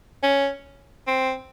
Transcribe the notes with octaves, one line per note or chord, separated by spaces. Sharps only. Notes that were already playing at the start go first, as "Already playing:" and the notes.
C#4
C4